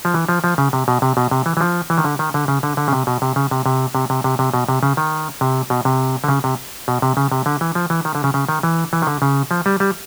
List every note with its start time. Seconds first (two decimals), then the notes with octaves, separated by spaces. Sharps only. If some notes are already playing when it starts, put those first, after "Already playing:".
0.05 F3
0.14 E3
0.29 F3
0.44 F3
0.58 C#3
0.73 C3
0.88 B2
1.02 C3
1.17 B2
1.31 C3
1.46 E3
1.57 E3
1.61 F3
1.90 E3
1.98 D#3
2.04 D3
2.19 D#3
2.34 D3
2.48 C#3
2.63 D3
2.77 D3
2.88 C#3
2.93 C3
3.07 B2
3.22 C3
3.36 C#3
3.51 C3
3.66 C3
3.95 C3
4.10 C3
4.24 C3
4.39 C3
4.54 B2
4.68 C3
4.83 C#3
4.97 D#3
5.41 C3
5.70 B2
5.85 C3
6.24 D3
6.29 C#3
6.44 C3
6.88 B2
7.02 C3
7.17 C#3
7.32 C3
7.46 D3
7.61 E3
7.75 F3
7.90 E3
8.05 D#3
8.15 D3
8.24 C#3
8.34 C#3
8.49 D#3
8.63 E3
8.93 E3
9.02 D#3
9.07 D3
9.22 C#3
9.51 F3
9.66 G3
9.80 G3